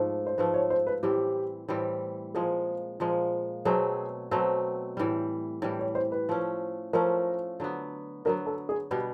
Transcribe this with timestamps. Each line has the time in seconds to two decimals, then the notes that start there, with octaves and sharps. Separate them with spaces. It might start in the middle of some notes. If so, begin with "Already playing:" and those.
Already playing: G#2 F3 A3
0.27 C5
0.38 G#2 F3 A3 B4
0.54 C#5
0.70 C5
0.87 B4
1.03 A2 E3 G3 C4 G4
1.68 A2 E3 G3 C4
2.34 A#2 F3 G#3 G#4
3.00 A#2 F3 G#3
3.65 B2 F#3 A3 C4 G#4
4.31 B2 F#3 A3 C4
4.97 A2 E3 G3
5.62 A2 E3 G3
5.79 C#5
5.95 C5
6.12 B4
6.29 F3 A3 C#4
6.93 F3 A3 C#4 A#4
7.60 D3 F#3 B3
8.25 D3 F#3 B3 A#4
8.46 A4
8.69 G#4
8.91 B2 G3 B3 G4